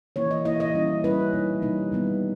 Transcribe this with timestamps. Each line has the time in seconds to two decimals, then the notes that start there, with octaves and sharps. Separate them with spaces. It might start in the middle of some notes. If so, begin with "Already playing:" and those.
0.16 E3 A#3 E4 C#5
0.31 D#5
0.45 E3 A#3 E4 D#5
0.60 D#5
0.74 G3 C#4 E4
1.04 G3 C#4 E4 B4
1.33 B2 G3 A#3 D#4
1.62 B2 G3 A#3 D#4
1.92 D#3 G3 B3